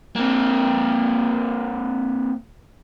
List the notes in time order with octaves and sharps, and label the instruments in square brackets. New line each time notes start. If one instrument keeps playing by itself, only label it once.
[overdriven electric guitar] A#3 C4